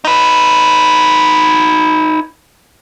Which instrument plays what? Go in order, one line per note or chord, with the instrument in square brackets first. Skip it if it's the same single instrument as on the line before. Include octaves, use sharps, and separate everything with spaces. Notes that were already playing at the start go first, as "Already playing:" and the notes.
[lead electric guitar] D#4 B4